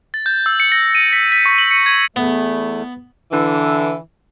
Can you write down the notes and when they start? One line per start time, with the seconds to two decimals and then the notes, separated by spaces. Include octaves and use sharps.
0.14 A6
0.26 G6
0.46 E6
0.60 C#7
0.72 A#6
0.95 D#7
1.13 B6
1.32 B6
1.46 C#6
1.58 F#7
1.71 C#7
1.86 G#6
2.16 E2 A3 B3
3.32 D3 E3